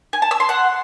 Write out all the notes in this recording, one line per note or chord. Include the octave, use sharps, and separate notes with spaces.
G#5
A5
E6
C6
F#5